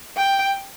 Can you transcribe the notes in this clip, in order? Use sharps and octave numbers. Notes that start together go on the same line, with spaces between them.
G5